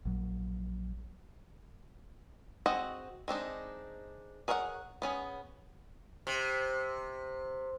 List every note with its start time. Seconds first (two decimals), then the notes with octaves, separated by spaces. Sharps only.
0.05 A#1 F#3
2.66 C4 F#4 G#4 D#5 F#5
3.28 G#3 C4 D4 D#4
4.48 G#4 A#4 C#5 F5 F#5
5.02 B3 C#4 G#4
6.27 C3